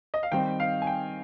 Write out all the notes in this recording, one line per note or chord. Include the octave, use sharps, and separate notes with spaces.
D#5
F5
D#3 G3 C4 D#4 G5
F5
G#5
G5